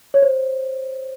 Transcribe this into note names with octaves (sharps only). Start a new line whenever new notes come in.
C#5
C5